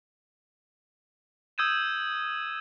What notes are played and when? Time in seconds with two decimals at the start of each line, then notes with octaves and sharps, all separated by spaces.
1.58 D#6 E6 G6 G#6 D#7 E7